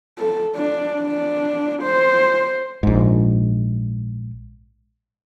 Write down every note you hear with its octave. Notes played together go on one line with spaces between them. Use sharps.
A4
D4
D4
C5
A#1 G#2